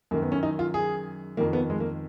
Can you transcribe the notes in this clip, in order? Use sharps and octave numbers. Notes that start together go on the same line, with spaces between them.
F#2 D#3 A#3
B3
C#4
D#4
F4
G#4
F2 D#3 A#3
B3
G#3
A#3